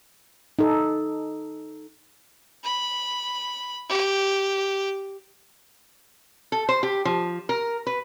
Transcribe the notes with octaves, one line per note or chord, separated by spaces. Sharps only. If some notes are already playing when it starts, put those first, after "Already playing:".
D#4 A4
B5
G4
A4
C5
G4
F3
A#4
B4